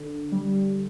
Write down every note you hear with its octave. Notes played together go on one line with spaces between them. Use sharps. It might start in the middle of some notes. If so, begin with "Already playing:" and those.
Already playing: D3
G3